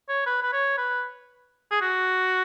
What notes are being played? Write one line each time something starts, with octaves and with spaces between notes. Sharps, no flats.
C#5
B4
B4
C#5
B4
G#4
F#4